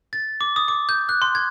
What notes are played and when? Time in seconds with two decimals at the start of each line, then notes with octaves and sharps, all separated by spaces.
0.13 A6
0.41 D6
0.56 D#6
0.68 D6
0.89 G6
1.09 F#6
1.22 C6
1.35 G#6